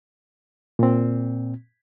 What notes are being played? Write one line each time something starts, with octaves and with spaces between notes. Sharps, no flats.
A#2 C4